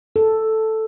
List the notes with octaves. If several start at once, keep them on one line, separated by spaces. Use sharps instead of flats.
A4